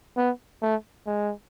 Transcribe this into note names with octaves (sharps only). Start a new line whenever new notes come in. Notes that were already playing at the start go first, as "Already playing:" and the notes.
B3
A3
G#3